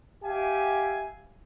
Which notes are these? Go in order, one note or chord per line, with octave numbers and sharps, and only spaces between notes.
G4 E5 F5 G#5